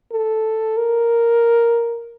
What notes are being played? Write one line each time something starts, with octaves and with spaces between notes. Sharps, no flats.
A4
A#4